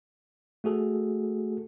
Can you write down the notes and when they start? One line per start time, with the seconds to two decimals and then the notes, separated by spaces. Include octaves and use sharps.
0.64 A3 F#4 G#4 A4